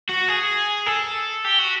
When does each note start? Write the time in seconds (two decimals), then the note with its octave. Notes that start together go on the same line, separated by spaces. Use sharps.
0.09 F#4
0.28 G#4
0.86 A4
1.45 G4
1.59 F#4